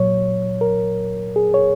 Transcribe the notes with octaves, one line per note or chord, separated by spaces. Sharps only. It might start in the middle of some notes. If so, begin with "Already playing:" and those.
Already playing: A#2 F#3 C#5
A#4
G#4
C#5